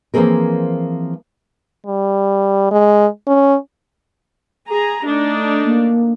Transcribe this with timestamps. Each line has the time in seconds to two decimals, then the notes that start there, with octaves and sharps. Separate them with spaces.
0.14 E3 F3 A#3 C4 G#4 A#4
1.87 G3
2.71 G#3
3.27 C#4
4.67 G#4 A#5
5.05 A3 D4 D#4
5.64 A#3